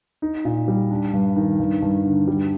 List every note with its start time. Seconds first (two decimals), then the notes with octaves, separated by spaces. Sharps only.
0.22 D#4
0.45 A#2
0.68 G3
0.91 D4
1.14 G2
1.36 D#3
1.60 G2
1.82 G2
2.05 D3
2.28 G3